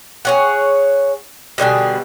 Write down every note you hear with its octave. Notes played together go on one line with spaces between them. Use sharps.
G#4 C#5 F#5
B2 D3 G3 G#4